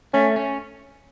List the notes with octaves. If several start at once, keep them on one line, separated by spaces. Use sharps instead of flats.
A3 C#4
C#4